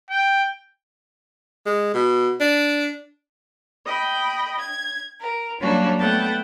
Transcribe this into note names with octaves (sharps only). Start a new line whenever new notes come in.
G5
G#3
B2
D4
D#5 G5 B5
G#6
A#4
F#3 G3 A#3 C#4 D4 F#4
A3 B3 F#5 G5 A5